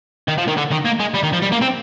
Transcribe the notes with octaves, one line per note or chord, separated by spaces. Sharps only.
D#3
F3
D#3
D3
D#3
A#3
G#3
G3
D#3
F3
G3
A#3
C4